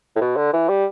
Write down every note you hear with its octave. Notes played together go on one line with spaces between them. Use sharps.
A2
B2
D3
E3
G3